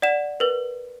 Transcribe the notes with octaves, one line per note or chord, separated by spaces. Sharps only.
D5 F#5 E7
A#4 B4